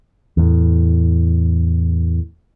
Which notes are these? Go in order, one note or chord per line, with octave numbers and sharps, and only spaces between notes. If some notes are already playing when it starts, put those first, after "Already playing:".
E2 A2